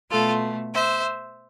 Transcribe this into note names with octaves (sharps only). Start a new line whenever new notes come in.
B2 A3 F4 A4
C5 E5